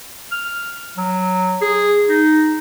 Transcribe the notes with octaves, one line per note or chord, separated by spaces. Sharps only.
F6
F#3
G#4
D#4